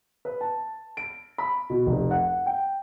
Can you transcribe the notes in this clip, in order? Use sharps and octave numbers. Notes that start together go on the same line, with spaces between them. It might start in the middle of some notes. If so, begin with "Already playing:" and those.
B4
A5
D7
B5
B2
F1
F#5
G5